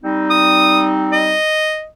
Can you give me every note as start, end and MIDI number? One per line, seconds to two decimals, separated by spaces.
0.04 1.36 55
0.04 1.36 60
0.04 1.36 63
0.30 0.88 87
1.13 1.87 75